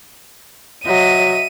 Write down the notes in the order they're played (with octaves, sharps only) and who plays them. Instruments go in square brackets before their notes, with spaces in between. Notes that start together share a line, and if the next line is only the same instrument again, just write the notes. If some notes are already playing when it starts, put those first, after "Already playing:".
[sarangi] F#3 [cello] D#5 E5 [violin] D#7